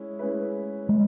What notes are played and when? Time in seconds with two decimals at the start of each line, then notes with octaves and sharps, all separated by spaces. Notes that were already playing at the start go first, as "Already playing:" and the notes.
Already playing: G#3 C#4 E4
0.19 G#3 C#4 E4 B4
0.89 G#3